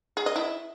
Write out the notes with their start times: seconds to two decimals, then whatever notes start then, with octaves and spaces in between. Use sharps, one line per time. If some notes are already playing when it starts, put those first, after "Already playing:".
0.17 G#4
0.26 D#5
0.36 E4